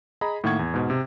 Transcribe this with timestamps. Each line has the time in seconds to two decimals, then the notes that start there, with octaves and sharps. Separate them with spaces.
0.21 G#4 D#5 A#5 B5
0.44 A2 D#3 A#3 F#5 C#6 G#6
0.59 E2
0.74 G#2 B2
0.90 C3